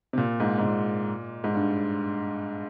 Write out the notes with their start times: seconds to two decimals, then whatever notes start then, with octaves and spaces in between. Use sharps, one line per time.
0.13 C3
0.18 A#2
0.40 G#2
0.58 G#2
0.63 A#2
1.44 G#2
1.54 G2